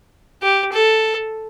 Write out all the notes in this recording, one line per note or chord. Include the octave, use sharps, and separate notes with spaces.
G4
A4